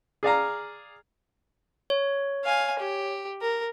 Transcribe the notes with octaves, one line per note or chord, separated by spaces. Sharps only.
G#4 D5 F5 A#5
C#5
F5 G#5
G4
A#4